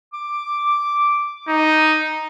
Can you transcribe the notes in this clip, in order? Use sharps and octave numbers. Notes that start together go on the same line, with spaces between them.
D6
D#4